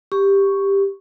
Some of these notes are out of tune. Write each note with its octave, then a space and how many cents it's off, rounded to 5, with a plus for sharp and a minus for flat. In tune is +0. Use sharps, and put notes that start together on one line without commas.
G4 +10 C#6 +0